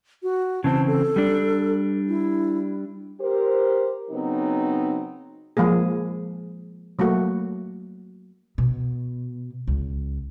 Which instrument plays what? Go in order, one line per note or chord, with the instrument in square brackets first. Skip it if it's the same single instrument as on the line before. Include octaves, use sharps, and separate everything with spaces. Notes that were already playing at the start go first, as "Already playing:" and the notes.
[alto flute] F#4
[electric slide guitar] C#3 E3 C4 [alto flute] A5
[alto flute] A4
[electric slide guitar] G3 D4
[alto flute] E4
[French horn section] G4 A#4 C5
C#3 F#3 B3 C4 D#4
[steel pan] F3 G#3 A#3 G#4
F#3 A3 A#3 F#4
[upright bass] B2
C#2